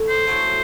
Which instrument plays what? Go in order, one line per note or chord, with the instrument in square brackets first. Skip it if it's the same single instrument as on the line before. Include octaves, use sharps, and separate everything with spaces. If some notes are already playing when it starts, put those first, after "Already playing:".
Already playing: [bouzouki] A2
[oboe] C5
[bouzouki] A2 F#3 A3